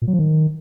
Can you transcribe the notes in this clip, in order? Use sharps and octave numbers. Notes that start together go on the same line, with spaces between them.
A#2
F#3
F3
D#3